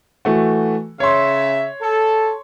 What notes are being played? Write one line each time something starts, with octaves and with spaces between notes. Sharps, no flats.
E3 A3 F#4
C#3 C#5 E5 C6
A4